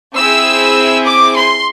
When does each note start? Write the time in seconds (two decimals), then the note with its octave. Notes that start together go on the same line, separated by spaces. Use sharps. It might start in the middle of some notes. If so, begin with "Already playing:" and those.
0.16 C4 E4 G#4 E6
1.05 D6
1.35 C6